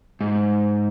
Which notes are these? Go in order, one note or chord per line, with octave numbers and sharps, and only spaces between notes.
G#2